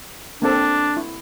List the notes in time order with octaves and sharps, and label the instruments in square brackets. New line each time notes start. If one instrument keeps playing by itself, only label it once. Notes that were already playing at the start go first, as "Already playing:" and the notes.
[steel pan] A#3 C4 A4 [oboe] D4
[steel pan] E4